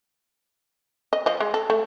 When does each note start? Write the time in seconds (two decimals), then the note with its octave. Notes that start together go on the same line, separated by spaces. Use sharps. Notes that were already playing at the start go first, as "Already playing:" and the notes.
1.13 D#5
1.26 F3 D#5
1.40 G#3
1.54 A4
1.70 A3